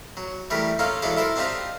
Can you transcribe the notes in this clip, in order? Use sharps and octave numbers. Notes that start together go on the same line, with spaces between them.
F#3
E3 G3 A3 G#4 A#4
A#3 C#4 D#4 F4 A4
E3 F#3 G#3 D4 G#4 A4
E4 A4 A#4 C5
C4 D4 D#4 F4 G4 C5